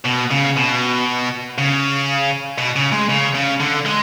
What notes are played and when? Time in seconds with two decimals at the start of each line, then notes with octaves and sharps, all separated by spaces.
0.05 B2
0.31 C#3
0.56 B2
1.58 C#3
2.58 B2
2.76 C#3
2.92 G#3
3.09 C#3
3.35 C#3
3.60 D3
3.85 G#3